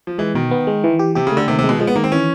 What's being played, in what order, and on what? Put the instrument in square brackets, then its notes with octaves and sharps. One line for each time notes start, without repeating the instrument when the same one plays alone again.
[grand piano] F3
[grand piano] E3 [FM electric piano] G#3
[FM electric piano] B2 [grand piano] D#3
[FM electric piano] B3
G#3
E3
G4
[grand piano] C3 [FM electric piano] G4
[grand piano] C#3
[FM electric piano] A3
[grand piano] D3
[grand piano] C3 [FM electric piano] D#3
[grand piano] C3
[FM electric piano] G#3
[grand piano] B2
[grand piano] F3 [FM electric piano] G#3
[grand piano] B3
[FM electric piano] D#3 [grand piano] A#3
[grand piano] C4
[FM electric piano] E3 [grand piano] C#4